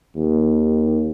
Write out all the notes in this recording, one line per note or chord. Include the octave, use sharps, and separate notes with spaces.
D#2